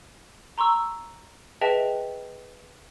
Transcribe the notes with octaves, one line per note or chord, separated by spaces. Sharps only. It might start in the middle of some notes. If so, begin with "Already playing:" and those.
A#5 C6 C#6 E6
G#4 B4 D#5 E5 G5 A5